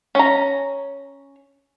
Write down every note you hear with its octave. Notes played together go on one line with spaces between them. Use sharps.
C#4 A#5